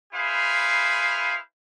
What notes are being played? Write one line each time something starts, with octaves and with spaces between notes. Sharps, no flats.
E4 G#4 B4 C5 F5